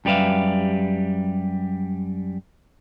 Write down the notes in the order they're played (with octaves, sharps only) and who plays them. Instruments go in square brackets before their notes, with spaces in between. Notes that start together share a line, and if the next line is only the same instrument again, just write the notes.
[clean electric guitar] F#2 G3 G4 B4 E5 F5